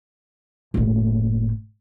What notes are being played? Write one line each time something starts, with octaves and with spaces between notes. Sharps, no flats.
F#1 A2